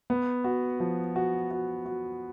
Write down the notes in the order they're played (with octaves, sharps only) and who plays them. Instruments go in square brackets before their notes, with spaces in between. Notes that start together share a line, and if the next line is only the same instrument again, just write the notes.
[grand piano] B3
F#4
F3
F#4
F#4
F#4